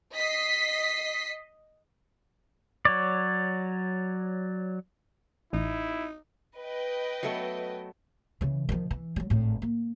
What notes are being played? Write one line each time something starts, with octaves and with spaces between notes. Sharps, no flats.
D#5 B6 C7
F#3 C#5 D5
A1 D#4 E4
B4 D#5 G5
F#3 A3 B3
C#3 E3
D#3 F3
E3
F#3 G3
G#1 A2
A#3